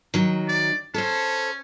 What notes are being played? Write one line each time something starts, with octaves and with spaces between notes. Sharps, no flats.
D#3 F#3
D5
C#4 A4 C5